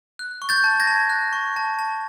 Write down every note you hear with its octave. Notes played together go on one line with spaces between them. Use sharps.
F#6
C#6
G6 A6
A5
G#6 A#6
A5
F#6
C#6
A5
A5